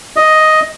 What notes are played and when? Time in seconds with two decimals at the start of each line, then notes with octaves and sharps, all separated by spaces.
0.16 D#5